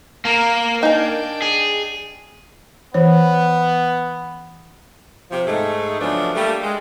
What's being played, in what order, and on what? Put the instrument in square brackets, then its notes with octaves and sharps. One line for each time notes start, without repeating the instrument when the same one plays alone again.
[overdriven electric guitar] A#3 [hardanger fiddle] A#4
[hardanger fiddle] D4 G5 [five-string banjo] D#4 G#5
[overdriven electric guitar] G#4
[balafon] E3 C#5 [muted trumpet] B3
[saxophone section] C3 F3 G4
G#2 A3 D#4
C#3 F3 F#3 A3 B3 D4
G3 A3 A#3
G#3